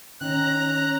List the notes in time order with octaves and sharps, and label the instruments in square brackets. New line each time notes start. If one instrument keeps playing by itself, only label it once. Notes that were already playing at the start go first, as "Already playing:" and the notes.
[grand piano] D#3 [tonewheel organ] C#4 [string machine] A#5 [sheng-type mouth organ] F#6